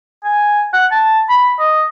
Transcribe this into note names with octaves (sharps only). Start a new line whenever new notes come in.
G#5
F#5
A5
B5
D#5